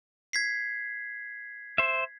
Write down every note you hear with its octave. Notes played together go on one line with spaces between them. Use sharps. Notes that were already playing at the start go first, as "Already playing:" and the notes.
G#6 B6 C7
C5 E5